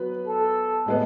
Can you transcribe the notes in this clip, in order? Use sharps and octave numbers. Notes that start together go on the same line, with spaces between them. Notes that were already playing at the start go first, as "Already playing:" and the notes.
Already playing: F#3 B3 B4
A4
A2 G#3 B3